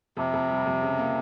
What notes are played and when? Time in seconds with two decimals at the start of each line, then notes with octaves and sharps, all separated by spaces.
0.17 F2 C3
0.34 F2
0.50 G3
0.66 F2
0.82 C#3
0.98 A#3